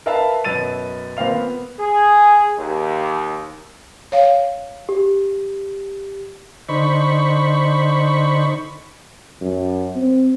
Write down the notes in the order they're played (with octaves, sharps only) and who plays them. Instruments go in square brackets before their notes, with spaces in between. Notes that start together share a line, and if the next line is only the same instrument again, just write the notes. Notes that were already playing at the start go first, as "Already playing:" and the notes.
[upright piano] A#4 B4 E5 F5 A5
F#2 B2 B3 E6 A6 D#7
A#2 C4 B4 F5 F7
B3
[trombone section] G#4
D#2
[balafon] C#5 F5
[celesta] G4
[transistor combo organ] D3 D#4 C5 B5 C#6
[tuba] F#2
C4